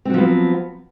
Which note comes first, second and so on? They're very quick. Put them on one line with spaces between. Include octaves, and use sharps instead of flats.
C4 F#3 F3 B3